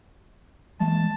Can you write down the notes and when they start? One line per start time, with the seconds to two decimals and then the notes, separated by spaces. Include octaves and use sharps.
0.80 E3 G#3 A#3 A5